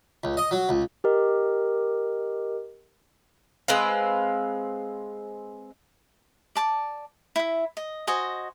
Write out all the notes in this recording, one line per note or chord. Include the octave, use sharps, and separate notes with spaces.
C#2
D#5
F#3
C#2
G4 A#4 D#5
G#3 C4 B4 F5
D5 A5 D6
E4 E5
D#5
F#4 C5 D#5 G#5